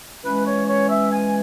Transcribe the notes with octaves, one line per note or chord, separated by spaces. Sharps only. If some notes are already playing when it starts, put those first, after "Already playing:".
E3 G#3 C#4 B4
C#5
C#5
E5
G#5